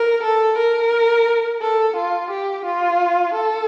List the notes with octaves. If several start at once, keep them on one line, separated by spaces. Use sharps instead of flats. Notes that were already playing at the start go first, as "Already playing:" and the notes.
Already playing: A#4
A4
A#4
A4
F4
G4
F4
A4